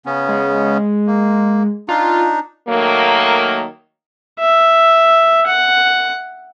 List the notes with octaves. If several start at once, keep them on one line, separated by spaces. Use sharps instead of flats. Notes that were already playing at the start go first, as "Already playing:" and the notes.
C#3 B3 C#4
G#3
A#3
D4 D#4 F4
D#3 F#3 A3 A#3
E5
F#5